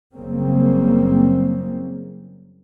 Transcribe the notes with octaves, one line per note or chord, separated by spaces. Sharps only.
F#1 C#3 G3 A#3 C4